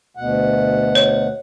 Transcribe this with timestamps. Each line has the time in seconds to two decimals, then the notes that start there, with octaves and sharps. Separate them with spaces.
0.17 D2 B2 F#5
0.95 C#5